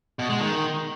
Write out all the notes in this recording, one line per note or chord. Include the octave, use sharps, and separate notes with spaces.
B2
G#3
D#3